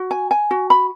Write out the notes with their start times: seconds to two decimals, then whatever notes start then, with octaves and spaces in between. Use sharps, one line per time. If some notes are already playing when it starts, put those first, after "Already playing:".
Already playing: F#4
0.11 G#5
0.31 G#5
0.51 F#4
0.70 B5